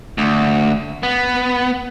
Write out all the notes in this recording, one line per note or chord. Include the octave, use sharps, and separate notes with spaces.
D2
B3